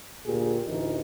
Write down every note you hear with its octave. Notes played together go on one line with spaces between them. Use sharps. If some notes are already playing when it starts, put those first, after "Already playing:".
D2 A#2 G4 G#4
A1 D2 E3 D#4 A#4